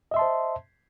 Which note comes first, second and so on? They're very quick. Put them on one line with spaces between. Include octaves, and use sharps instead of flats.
D#5 E5 C6 A5 C5